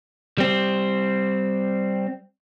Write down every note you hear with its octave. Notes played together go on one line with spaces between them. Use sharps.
G3 C4